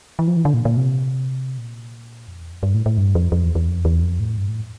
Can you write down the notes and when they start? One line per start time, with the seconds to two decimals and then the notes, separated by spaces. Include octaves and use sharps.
0.19 E3
0.28 F3
0.37 E3
0.45 D3
0.54 A#2
0.65 A#2
0.77 C3
1.58 A#2
2.28 F2
2.40 E2
2.52 F2
2.63 G2
2.74 A2
2.86 A2
2.98 G2
3.15 F2
3.32 F2
3.44 E2
3.55 E2
3.68 F2
3.85 E2
4.02 F2
4.20 A2
4.37 G2
4.49 A2